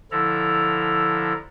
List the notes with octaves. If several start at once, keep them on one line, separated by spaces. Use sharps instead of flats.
D3 F3 E4 A4 A#5